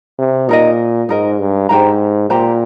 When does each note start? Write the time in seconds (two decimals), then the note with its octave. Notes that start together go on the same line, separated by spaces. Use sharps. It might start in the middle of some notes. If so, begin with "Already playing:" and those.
0.19 C3
0.49 A#2 D#4 A#4 D#5
1.09 G#2 D#4 A#4 D#5
1.39 G2
1.69 G#2 G4 C5 G5 A#5
2.29 A#2 G4 C5 G5 A#5